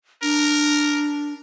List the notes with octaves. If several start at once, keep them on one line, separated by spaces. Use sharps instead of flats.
D4 A#4